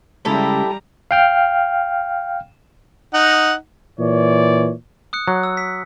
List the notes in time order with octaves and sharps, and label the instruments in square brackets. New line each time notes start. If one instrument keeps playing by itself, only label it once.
[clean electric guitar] C#3 G#3 [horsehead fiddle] G3 A#5 [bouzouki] E4 G4 A4
[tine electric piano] F5 G5 F6
[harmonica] D#4 F#5
[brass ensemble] A#2 E3 C#5 D5
[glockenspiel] D#6 F#6 C#7
[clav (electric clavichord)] F#3
[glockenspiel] E6
B6